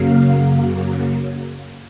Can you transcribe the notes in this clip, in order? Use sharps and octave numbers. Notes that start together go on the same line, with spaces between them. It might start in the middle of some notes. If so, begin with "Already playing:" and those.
Already playing: F#2 C#3 F#3 A#3 F5